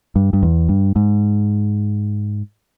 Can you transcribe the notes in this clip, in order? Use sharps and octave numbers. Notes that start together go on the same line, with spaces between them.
G2
G2
E2
G2
G#2